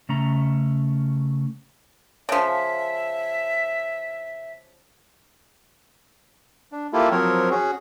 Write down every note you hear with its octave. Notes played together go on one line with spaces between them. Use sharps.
C#3 A3 C#4 A#5
C#3 F3 E5
D4
A#3 E4 F4 G4 A4
F3 F#3 C4 A#4 C#5
C#4 F#4 G#4